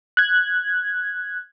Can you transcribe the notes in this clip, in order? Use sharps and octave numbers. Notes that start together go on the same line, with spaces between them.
F#6 G#6